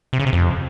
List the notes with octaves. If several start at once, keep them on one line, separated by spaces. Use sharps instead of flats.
C3
C#3
C3
F2